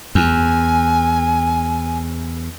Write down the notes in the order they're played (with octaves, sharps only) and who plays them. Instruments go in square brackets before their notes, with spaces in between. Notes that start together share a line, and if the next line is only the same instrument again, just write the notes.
[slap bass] E2 [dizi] G#5